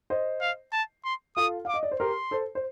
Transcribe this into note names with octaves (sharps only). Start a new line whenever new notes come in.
C5 D#5
F5
A5
C6
F4 A4 D#6
F5 D6
D#5
D5
C5
G4 A#4 C6
A4 C5
C5